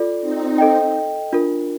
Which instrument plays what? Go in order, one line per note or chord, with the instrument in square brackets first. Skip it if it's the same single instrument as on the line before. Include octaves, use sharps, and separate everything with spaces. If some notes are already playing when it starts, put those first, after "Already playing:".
Already playing: [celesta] F4 A4 D5
[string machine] C4 D#4
[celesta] A4 D#5 G5
D4 F4 A#4